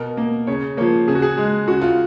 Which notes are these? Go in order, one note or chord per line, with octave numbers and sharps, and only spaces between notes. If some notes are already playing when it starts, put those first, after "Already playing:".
Already playing: B2 A#4
A#3
C#3 C#5
F3 A#3 C#5
C#3 G#4
F#4
G#4
G#3
C#3 F#4
F4